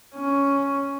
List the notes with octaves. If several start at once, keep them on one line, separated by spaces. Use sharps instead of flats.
C#4